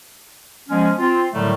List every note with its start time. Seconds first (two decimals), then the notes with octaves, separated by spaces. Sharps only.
0.69 F3 G#3 B3 C#4
0.99 C4 F4
1.33 A2 D3 D#3 F#3 G3 A3